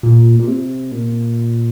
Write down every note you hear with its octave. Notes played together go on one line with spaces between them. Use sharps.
A#2
A#2
C3
A#2